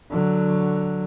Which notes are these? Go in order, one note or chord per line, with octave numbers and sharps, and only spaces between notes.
D3 F#3